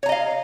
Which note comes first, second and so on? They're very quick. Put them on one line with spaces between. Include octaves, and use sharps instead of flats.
C#5 A#5 D#5 F5